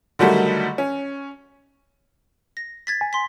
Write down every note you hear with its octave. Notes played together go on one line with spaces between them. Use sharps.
D3 D#3 F#3 G3 A3
C#4
A#6
G#6 A6 B6
G#5
C6 B6